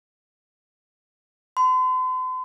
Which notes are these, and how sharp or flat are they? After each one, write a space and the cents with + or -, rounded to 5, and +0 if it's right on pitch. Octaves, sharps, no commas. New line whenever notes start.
C6 -45